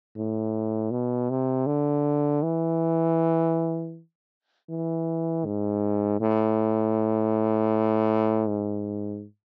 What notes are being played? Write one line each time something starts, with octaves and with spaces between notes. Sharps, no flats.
A2
B2
C3
D3
E3
E3
G#2
A2
G#2